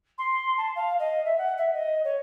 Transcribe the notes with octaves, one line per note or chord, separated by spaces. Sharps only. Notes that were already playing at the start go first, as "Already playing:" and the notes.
C6
A5
F5
D#5
E5
F#5
E5
D#5
C#5